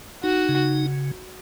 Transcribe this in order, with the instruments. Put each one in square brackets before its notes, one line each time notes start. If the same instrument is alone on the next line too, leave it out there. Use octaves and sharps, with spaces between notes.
[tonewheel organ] D#4 [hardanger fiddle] F#4
[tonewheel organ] C#3